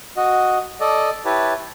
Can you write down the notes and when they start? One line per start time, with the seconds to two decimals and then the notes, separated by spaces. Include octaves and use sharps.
0.17 F#4 D#5
0.80 A4 D5 D#5
1.25 E4 G4 B4 C#5 A5